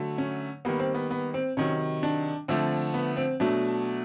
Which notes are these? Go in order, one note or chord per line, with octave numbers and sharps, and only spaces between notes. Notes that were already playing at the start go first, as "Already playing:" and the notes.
Already playing: D3 F#3 A3
C#4
D#3 G3 A#3 B3
C4
B3
B3
C4
C3 D#3 F#3 C#4
D4
D3 F3 A3 C4
B3
C4
B2 F#3 A3 D4